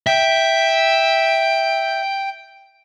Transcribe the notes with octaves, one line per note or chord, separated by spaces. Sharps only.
E5 G5